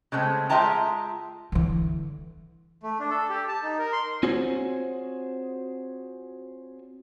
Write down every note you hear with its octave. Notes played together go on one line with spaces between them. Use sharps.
C#3 G#3 A3 C4
G#3 F4 E5 G5 A5 A#5
D3 E3
A3
D4
A4
G4
A5
D#4
A#4
C6
C4 F4 F#4 G#4 C5 C#5